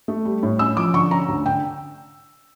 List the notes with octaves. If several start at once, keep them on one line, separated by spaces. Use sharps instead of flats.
A3
G3
A2
C#4 E6
F3 D6
D3 C#6
C#4 A#5
D2
D3 G5